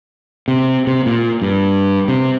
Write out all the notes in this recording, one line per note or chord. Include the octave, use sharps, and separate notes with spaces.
C3
C3
A#2
G2
C3